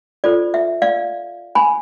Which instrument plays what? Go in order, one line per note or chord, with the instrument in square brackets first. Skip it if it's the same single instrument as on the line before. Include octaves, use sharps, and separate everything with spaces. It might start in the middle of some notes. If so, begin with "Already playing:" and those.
[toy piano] F4 A4 C5 D5
E5
D5 F5
G#5 B5